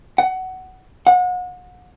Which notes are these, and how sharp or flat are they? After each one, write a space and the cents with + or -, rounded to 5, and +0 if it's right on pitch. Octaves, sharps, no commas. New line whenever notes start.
F#5 +15
F#5 -35